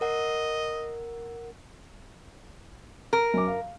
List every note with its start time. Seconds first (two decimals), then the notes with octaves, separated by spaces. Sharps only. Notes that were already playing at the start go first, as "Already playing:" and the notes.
0.01 A#4 D#5 F#5
3.13 A#4
3.34 F#2 D6
3.47 F5